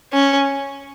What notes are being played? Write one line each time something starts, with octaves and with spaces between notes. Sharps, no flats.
C#4